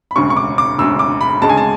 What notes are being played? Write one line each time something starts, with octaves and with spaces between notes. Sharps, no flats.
B5
E1 D2 C#3 C#6
C#6
D6
D6
E1 D2 C#3 E6
D6
B5
D2 C#3 G#3 A5
G#5
A5